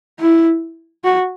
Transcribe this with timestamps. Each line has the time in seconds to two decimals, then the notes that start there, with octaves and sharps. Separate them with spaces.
0.20 E4
1.04 F#4